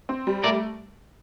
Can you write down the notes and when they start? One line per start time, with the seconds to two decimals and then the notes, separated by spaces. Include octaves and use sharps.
0.09 C4
0.27 G3
0.43 A3 A#4 D5